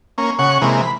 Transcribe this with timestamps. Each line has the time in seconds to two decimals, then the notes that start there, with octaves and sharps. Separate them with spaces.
0.18 A#3 C#4
0.39 C#3 F#5 C#6
0.62 C3 E3 G#3 A#3
0.82 B5